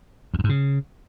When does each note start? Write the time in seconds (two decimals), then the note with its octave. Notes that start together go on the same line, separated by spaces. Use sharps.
0.34 E2
0.39 F#2
0.44 G#2
0.49 C#3